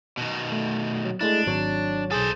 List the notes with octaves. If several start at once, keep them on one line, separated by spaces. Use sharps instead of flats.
B2 D#3
A3
F#3
G#3 A3 D4 E4
G#1 F#3 C#5
B1 G#4 A4 C5